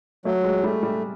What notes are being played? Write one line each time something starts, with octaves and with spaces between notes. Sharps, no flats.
F#3 A3
G#3
G3 A3
G3